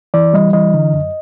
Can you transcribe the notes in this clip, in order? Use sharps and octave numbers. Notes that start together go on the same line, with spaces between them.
E3 D5
G3 D#5
E3 D#5
D3
F#2